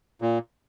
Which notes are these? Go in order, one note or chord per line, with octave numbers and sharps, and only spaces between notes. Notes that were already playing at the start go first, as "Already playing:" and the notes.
A#2